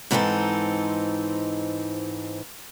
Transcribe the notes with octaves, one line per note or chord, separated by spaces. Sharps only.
G#2 E3 C4 D#4 E4 A4